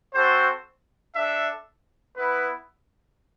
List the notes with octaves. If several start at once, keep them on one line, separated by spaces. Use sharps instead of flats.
C4 F#4 A4 C5
D4 A4 E5
B3 E4 B4